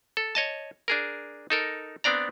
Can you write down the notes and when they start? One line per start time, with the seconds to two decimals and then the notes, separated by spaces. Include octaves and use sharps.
0.17 A4
0.35 C#5 D#5 A5
0.88 D4 G#4 A#4
1.50 D#4 A4 A#4
2.04 B3 C4 D4 D5 A#5